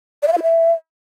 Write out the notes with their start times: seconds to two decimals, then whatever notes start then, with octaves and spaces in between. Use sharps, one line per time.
0.22 D5
0.27 E5
0.32 F5
0.37 E4
0.42 E5